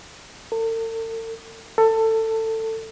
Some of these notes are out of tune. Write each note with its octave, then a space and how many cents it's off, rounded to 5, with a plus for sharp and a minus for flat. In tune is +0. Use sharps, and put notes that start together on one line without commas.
A4 +45
A4 +20